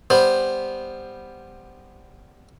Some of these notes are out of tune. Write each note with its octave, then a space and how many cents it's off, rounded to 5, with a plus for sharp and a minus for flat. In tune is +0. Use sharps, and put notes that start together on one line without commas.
G3 +10 B3 +0 C5 +0